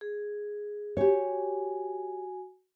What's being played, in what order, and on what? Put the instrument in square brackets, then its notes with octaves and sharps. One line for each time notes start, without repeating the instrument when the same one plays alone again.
[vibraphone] G#4
[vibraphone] F#4 G#5 [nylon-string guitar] G4 C#5